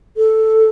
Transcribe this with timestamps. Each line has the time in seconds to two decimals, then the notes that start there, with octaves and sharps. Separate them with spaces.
0.17 A4